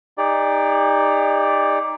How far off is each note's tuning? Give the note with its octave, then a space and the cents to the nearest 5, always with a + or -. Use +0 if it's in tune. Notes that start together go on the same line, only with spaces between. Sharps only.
D#4 +0 G4 +45 D5 +0